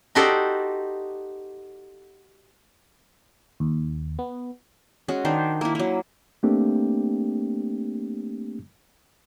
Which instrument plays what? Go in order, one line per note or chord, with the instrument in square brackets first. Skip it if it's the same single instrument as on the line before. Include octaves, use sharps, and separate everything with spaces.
[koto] D#4 F#4 G4 A4 C5 D5
[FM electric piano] D#2
B3
[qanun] G#3 C#4 F#4
D#3 D4 C5
A#3 E4
F#3 A#3
[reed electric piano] A3 A#3 C4 D4 G4